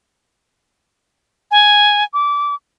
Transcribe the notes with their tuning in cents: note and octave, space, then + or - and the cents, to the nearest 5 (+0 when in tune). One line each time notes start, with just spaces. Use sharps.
G#5 +0
D6 -20